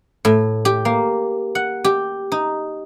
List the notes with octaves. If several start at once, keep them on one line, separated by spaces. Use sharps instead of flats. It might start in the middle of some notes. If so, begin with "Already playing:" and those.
A2
G4
A#3
F#5
G4
D#4